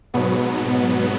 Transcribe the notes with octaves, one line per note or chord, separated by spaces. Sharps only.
G#2 B2 F#3 B3